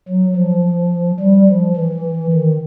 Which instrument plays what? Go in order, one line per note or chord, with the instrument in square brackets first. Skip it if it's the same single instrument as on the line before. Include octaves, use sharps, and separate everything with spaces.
[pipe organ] F#3
F3
G3
F3
E3
D#3